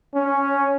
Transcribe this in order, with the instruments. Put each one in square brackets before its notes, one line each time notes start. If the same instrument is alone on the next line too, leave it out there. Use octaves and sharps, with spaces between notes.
[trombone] C#4